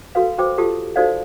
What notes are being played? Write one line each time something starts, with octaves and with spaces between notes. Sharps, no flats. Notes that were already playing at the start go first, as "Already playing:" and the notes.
F#4 A4 B4 F5
F#4 B4 C5 G5 D6
F4 G4 A4 A5 D#6
D#4 F#4 A4 C5 D5 F5